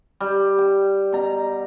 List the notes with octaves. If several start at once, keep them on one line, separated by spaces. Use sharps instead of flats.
G3
G5
B2 A#5